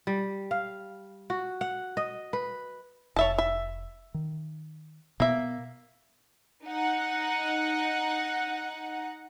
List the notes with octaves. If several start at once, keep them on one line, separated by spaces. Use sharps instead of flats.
G3
F5
F#4
F#5
D#5
B4
F1 C#5 E5 A5
E5
D#3
B2 A#3 B3 E5
D#4 F#5